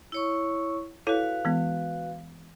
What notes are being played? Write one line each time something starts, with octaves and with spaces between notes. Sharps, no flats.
E4 C#5 C#6
E4 F#4 A4 B4 C#5 F5
E3 G#3 B3